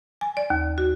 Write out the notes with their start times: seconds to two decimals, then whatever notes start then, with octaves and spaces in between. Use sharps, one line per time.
0.21 G#5
0.37 D5
0.50 D#2
0.78 F#4